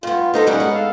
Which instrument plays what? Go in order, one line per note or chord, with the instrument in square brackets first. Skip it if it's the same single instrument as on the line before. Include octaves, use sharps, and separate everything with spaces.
[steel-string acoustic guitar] G2 B3 [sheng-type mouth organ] F4
[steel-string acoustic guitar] B3 D#4 A4 [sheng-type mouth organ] C5 D#5
[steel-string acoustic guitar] B2 G3 A#3 [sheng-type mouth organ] C#4 D#4 F#5
[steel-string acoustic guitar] A2 G#3 B3
[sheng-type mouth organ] A4 F5